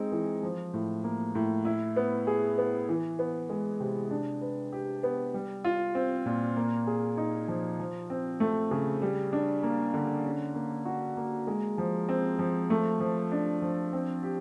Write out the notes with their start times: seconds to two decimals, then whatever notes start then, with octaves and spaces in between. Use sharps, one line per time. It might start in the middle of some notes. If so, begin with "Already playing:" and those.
Already playing: G#3 C4 D#4
0.12 E3
0.43 F3
0.74 A2
1.04 A#3
1.35 A2
1.65 E4
1.96 B3
2.27 G#4
2.58 B3
2.89 E3
3.19 B3
3.49 G#3
3.80 C3
4.11 D4
4.41 B4
4.72 G4
5.03 B3
5.34 G3
5.64 F4
5.95 C4
6.26 A#2
6.57 A#3
6.87 G#4
7.17 D#4
7.48 F3
7.79 F3
8.10 C4
8.40 A3
8.71 C#3
9.02 G3
9.33 D4
9.63 A#3
9.94 D3
10.24 C#4
10.55 A#3
10.85 F#4
11.17 A#3
11.47 G#3
11.78 F3
12.09 C4
12.39 F3
12.70 A3
13.00 F3
13.32 D4
13.62 F3
13.93 C4
14.23 G4